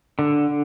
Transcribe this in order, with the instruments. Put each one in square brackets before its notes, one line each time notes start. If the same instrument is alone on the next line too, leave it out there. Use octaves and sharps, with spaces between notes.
[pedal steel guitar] D3